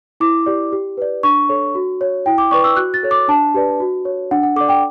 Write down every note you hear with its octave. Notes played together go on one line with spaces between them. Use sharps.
E4 D6
G4 D5
G4
B4 D5
D4 C#6
A4 C#5
F#4
C#5
E4 G5
D6
B4 D5 C#6
E6
F#4 F#6
A6
A4 C#5
D6
D4 A5
G4 B4 D5
F#4
C#5
D4 F#5
F#5
A4 D5 D6
G5